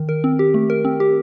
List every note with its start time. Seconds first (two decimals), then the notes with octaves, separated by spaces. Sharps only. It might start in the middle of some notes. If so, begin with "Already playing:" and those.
Already playing: D#3
0.09 A#4
0.24 C4
0.39 G4
0.54 A3
0.70 A#4
0.85 C4
1.00 G4